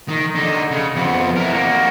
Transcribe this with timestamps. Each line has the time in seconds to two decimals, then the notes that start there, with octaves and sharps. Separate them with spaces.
0.08 D#3
0.35 D3 D#4
0.71 C#3
0.96 F2 B3
1.36 E4 A#4
1.53 A#3 F#4